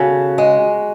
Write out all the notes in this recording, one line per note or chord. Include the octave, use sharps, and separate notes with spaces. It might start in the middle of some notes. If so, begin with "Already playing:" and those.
Already playing: C#3 F#4 A4
G#3